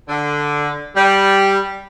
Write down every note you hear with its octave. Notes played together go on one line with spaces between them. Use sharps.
D3
G3